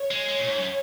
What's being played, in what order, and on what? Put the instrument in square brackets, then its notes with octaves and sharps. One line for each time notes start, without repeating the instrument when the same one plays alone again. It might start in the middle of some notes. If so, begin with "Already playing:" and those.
Already playing: [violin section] C#5
[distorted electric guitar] G#3
G#3
A#2
G#2
F#2